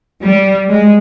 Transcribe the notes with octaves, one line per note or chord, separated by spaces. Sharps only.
G3
G#3